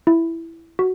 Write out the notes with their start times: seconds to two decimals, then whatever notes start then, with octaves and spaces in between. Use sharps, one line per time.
0.07 E4
0.79 F#4